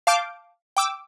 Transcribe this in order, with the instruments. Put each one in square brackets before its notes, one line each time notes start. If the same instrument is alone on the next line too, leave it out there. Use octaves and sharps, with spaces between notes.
[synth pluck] F5 A5 D6 G6 D7
G5 D6 E6